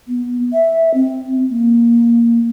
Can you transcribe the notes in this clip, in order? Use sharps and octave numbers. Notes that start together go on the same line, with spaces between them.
B3
E5
C4
A#3